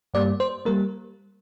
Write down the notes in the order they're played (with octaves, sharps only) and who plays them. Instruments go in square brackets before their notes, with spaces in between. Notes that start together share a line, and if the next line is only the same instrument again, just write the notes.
[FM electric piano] G2 G3 A#3 D5
C5
G3 A#3 A#4